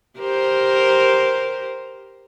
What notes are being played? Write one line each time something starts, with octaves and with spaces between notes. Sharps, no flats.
G4 A#4 C5